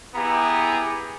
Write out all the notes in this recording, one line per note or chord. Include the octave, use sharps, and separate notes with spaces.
B3 E4 G4 G#4 A#5